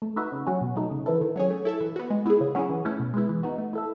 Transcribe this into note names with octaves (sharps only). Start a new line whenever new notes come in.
A3
D#4 F#4 B4 E5
C#3
F#3 C#4 F#4
B2
F#3 A3 D#4
C#3
E3 B3 E4 A4
D#3
F#3 C#4 G#4 C#5
A3
E4 A4 E5
E3
B3 F#4
G#3
B3 E4 G#4
C#3
F#3 C#4 E4 G#4
E3
A3 C#4 E4
B2
G#3 B3 E4
E3
B3 D#4 F#4
A3
E4 A4 E5